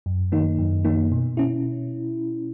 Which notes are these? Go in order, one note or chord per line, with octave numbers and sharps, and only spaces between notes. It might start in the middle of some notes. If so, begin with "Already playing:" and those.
F#2
D#3 A#3 D#4
F#2
D#3 A#3 D#4
B2
C#4 E4